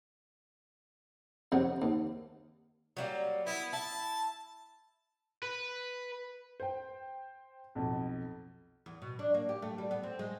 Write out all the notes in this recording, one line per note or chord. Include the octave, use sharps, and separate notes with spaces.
F2 C3 F#3
D#2
F#3 G3 A#3
B3 E4
E4 A5
B4
C5 G5
B1 F2
E2
B2
D4
A#3
G4
A3
G3
B3
C4
G#3